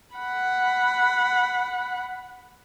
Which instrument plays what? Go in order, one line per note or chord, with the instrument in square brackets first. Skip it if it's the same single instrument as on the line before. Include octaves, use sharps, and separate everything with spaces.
[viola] F#5 B5